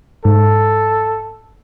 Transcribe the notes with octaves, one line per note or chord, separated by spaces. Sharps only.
G#2 A4